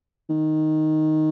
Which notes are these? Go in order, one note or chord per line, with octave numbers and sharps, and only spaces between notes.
D#3